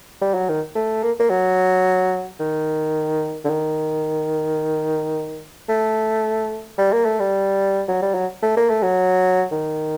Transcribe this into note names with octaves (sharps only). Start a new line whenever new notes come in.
G3
F#3
D#3
A3
A#3
A#3
F#3
D#3
D3
D#3
A3
G3
A#3
A3
G3
F#3
G3
F#3
A3
A#3
A3
F#3
D#3